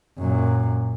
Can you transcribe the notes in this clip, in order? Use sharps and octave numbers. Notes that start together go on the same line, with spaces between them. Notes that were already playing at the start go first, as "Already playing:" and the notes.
F#2 A#2